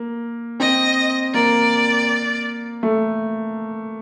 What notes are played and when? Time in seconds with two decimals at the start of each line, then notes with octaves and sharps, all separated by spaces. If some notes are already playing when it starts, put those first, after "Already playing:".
Already playing: A#3
0.60 C4 D#5
1.34 A#3 D5
2.83 A3